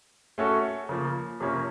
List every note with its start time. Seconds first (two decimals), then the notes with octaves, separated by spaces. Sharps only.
0.38 A3 C#4 F#4 A4
0.89 C#3 F3 A#3
1.40 F2 C3 F3 A#3 C#4